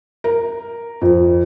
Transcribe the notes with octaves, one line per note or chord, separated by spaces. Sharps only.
A#4
F2